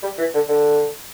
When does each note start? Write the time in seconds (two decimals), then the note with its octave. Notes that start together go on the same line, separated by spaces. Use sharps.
0.02 G3
0.18 E3
0.34 D3
0.48 D3